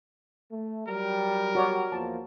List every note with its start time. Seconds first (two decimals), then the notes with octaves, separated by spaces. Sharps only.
0.50 A3
0.88 F#3 G3 A#4
1.55 F#4 C#5 D5
1.92 E2 F3 A#3 A5